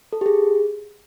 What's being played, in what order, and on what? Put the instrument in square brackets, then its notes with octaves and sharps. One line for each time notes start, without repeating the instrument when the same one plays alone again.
[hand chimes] A4
G4
G#4